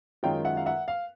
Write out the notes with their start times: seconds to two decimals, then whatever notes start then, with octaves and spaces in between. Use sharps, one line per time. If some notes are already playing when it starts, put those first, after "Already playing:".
0.23 F#2 D#3 G#3 C#4 F4 F5 G5
0.44 E5 F#5
0.57 F5
0.66 E5 F#5
0.88 F5